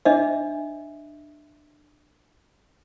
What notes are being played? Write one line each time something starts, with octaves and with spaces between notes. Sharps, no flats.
D4 D#5 E5